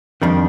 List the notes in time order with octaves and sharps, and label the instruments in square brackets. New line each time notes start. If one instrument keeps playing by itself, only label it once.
[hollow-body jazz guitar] F2 D#3 G3 D4